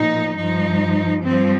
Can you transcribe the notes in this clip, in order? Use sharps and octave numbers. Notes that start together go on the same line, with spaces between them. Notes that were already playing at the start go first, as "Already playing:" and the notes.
Already playing: A#2 F3 D#4
G2 F3 D#4
G2 F3 C4